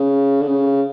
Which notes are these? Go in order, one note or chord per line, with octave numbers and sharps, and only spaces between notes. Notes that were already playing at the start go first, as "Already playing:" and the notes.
Already playing: C#3
D3
C#3